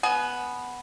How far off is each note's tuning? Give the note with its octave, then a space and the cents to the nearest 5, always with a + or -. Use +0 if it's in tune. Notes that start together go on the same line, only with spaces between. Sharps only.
B3 +0 G#5 +30